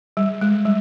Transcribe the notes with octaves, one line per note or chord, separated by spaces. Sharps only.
G3
G#3
G3